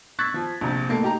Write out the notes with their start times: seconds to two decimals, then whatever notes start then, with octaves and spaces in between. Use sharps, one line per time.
0.19 C#6 E6 F#6 G#6 A6 B6
0.34 F3
0.61 A#1 C3
0.89 A2 A#3 A4
1.02 D#4 G4 A#5